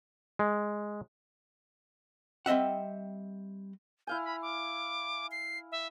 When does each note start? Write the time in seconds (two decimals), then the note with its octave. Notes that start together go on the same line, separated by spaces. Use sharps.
0.39 G#3
2.46 G3 C4 D#5 E5 F#5
4.07 E4 F5 G#5 G6
4.24 B5
4.42 D6
5.31 C7
5.72 E5